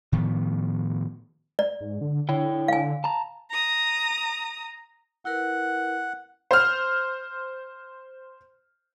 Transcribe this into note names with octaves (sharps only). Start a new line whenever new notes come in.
A2 D#3 F3 B3
D5
G#2
D3
D3 E4 C#5 G5
F5 G#5
A5 A#5
A#5 D#6
E4 A#4 B4 F#5
C5 F6